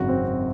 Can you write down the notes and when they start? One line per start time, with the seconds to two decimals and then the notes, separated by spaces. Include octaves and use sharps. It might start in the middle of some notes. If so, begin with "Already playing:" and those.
Already playing: G#1 F#2 C#3 F#4
0.09 C4